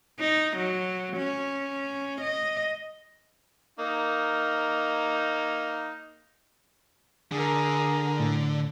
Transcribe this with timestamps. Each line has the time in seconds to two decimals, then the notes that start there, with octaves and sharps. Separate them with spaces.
0.20 D#4
0.57 F#3
1.17 C#4
2.21 D#5
3.79 A#3 D#4
7.32 D3 G#4 A#4
8.20 A2